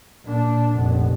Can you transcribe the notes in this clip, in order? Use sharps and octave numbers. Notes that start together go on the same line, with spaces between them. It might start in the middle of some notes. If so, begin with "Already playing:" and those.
A#2 D4
F1 A#1